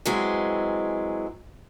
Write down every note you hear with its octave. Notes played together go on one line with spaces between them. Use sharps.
E3 F#3 G#3 C4